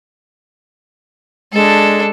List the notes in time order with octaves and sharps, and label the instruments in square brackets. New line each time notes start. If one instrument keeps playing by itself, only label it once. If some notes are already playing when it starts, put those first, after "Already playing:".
[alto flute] G#3 [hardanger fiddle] D4 A4